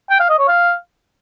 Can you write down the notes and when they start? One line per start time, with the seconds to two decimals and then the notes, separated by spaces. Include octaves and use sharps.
0.10 G5
0.20 F5
0.29 D#5
0.39 C#5
0.48 F5